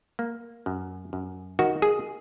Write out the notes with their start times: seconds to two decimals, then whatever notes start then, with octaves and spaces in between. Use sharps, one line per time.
0.19 A#3
0.66 F#2
1.13 F#2
1.59 D#3 F#4
1.82 G#4